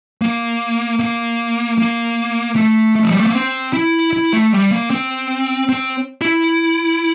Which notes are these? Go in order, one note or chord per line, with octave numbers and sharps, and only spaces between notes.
A#3
A#3
A#3
A3
A3
F3
G3
A3
A#3
C4
E4
E4
A3
G3
A#3
C4
C4
E4